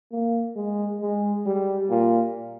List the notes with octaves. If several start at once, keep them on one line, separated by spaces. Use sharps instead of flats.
A#3
G#3
G#3
G3
A#2